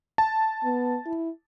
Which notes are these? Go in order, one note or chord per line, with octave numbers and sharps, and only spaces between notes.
A5
B3
E4